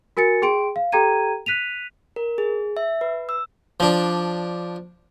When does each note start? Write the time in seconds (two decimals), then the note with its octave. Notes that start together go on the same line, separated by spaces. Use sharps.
0.17 F#4 A#4 G#5 A6 C#7
0.42 G#4 G5 C6 D7
0.76 F5
0.92 G4 A4 G5 A#5 G#6 D#7
1.46 F#6 B6 D#7 F7
2.16 A#4
2.38 G#4
2.77 E5
3.01 B4
3.29 E6
3.80 F3 D4